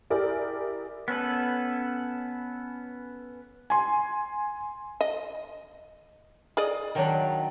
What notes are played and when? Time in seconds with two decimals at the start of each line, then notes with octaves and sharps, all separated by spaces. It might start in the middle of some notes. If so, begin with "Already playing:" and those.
0.10 E4 G4 G#4 A#4 D5
1.08 B3 C#4 A4 B4
3.70 G#5 C6
5.01 D#5
6.57 G#4 D5 D#5
6.95 D#3 F#3 D4